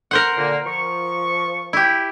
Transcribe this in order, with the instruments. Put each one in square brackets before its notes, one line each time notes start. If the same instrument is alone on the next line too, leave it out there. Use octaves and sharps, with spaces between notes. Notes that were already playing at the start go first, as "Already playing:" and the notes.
[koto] A#4 C5 F#5
[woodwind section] A#2 D3 A#3
F3 C#6
[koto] E4 G4